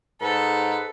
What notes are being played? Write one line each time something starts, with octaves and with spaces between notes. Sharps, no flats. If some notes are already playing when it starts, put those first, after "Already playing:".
G#2 A4 B4